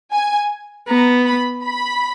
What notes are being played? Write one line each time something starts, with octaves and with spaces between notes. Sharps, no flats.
G#5
B3 A#5
B5
B5